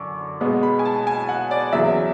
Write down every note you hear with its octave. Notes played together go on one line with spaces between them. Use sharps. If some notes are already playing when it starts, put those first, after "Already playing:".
Already playing: F#2 D3 C#6 D6
B2 G#3 B3
B5
G#5
A5
G#5
F#5
D5
E2 C#3 F#3 E5